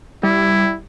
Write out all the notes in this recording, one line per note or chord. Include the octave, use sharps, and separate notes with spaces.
G3 E4